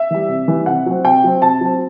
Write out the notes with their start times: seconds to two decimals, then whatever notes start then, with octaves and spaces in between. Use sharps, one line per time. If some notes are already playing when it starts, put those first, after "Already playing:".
Already playing: E5
0.10 E3 G3
0.29 C3
0.48 E3 G3
0.66 C3 F#5
0.86 F#3 C4
1.05 C3 G5
1.24 F#3 C4
1.42 C3 A5
1.61 F#3 C4